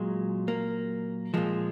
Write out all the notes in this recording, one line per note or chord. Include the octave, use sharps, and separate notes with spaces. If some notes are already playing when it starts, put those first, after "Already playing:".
Already playing: A#2 F#3 G#3
A#3
A#2 F3 G#3